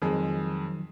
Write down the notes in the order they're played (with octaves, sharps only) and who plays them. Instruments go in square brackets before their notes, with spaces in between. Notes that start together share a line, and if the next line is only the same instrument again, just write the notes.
[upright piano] F2 G#3 [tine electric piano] D#3 F3 F#3